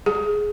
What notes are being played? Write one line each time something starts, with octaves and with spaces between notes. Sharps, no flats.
G#4